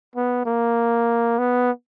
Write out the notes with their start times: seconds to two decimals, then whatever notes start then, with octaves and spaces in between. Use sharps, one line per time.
0.15 B3
0.46 A#3
1.38 B3